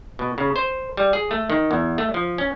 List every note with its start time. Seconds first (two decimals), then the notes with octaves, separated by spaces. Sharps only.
0.19 B2
0.38 C#3
0.56 C5
0.97 G3
1.13 G#4
1.31 A3
1.50 D#3
1.71 E2
1.98 A3
2.14 F3
2.38 C#4